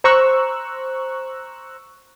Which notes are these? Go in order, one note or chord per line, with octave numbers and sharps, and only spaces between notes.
C5 A#5 C#6 E6 F#6